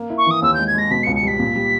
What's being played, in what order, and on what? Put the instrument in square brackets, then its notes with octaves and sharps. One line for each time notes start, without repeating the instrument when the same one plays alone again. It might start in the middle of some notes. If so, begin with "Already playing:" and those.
Already playing: [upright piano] A#3
E4
[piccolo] C#6
[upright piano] E3 [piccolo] D#6
[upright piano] D#2 [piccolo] E6
[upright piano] G#3 [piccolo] G6
[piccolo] G#6
[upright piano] G#3 [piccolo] A#6
[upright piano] B2 [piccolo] B6
[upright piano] C#2 [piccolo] C#7
[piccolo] C#7
[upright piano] G3 [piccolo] B6
[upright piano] A#2
G3